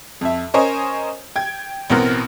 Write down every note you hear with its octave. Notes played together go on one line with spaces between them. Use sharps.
F2 E5
C#4 A#4 C5 C#5 D#5 G#5
G5 G#6
A1 B2 B3 C4 A#4 F6